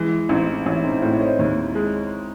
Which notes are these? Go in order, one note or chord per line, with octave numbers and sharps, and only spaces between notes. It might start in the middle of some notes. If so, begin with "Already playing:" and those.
Already playing: E3 G#3
A1 C4 D#4
A1 C#4 E4
C4 D#4
A2 C#4 E4
C#5
C5 D#5
D#2
G#3